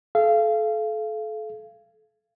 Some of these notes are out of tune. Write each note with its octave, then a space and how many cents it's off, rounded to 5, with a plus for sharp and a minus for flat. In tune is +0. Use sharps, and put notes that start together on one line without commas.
A4 -30 F5 -25